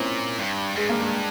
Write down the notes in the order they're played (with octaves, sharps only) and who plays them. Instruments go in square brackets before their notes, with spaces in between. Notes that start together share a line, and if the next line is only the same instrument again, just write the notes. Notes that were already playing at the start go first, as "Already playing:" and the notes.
Already playing: [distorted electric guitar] A#2 [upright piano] C4 C#4 E4
[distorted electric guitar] G2
[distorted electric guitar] G2 [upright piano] G#3
[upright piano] A#3
G#3